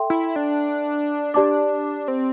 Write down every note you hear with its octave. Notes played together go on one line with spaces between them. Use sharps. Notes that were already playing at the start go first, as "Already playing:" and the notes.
Already playing: A4 E5 G5 C6
E4
D4
D4 G4 D5 A5 D6
C4